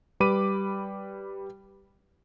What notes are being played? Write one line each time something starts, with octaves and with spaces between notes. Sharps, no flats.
G3 B4 B5 D6 D#7